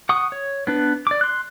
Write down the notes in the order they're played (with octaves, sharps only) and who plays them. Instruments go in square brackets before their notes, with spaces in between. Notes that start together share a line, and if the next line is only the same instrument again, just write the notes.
[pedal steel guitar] F#5 C#6 D#6
C#5
B3 D4 B4
D5 D6
C6 F#6